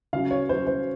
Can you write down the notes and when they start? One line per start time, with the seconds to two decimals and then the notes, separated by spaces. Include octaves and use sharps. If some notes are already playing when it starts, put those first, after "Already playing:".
0.13 C#3 F#3 F5
0.31 C#5
0.49 C#3 F#3 C5
0.67 C5